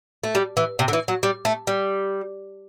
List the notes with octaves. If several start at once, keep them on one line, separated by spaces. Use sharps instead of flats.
A3
G3
E3
C3
D3
E3
F#3
G3
A3
G3